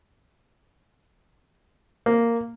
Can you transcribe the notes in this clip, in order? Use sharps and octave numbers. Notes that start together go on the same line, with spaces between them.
A#3